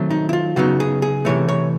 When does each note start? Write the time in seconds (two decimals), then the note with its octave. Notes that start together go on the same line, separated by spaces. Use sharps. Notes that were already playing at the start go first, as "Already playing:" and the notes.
Already playing: D#3 F#3 A3 C4
0.10 D#4
0.29 E4
0.33 F4
0.56 C#3 F#3 B3 D#4 F#4
0.80 G#4
1.02 G#4
1.25 C3 E3 A3 C#5
1.48 C#5